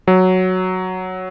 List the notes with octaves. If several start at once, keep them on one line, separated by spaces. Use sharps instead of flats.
F#3